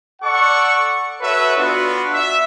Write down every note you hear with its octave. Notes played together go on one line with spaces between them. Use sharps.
A4 D5 F#5 C#6
F#4 A4 B4 C#5 E5
B3 D4 F4 F#4
E5